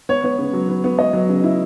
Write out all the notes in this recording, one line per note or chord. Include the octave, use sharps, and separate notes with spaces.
B3 C#5
B3
C#3
F#3
B3
B3
B3 D#5
F#3
C#3
E4